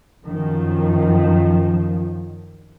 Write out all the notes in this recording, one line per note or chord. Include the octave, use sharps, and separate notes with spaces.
F#2 D#3 F3